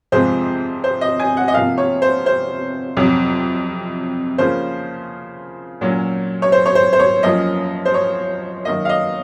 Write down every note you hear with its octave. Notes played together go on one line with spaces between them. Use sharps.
F2 C3 F3 G#3 C5
C5
D#5
G#5
F#5
D#5
C3 F3 A#3 F5
C#5
C5
C5
F2 C3 F#3
C#3 F3 A#3 C#4 C5
A#2 F#3 C#4
C#5
C5
C#5
C5
C5
C#5
F#2 F3 A#3 C#4 D#5
C5
C#5
F#2 D#3 A#3 D#5
F5
D#5